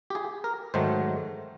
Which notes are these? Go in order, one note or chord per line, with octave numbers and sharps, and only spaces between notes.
G4
G#4
A#4
G#2 D#3 F#3 A3 C5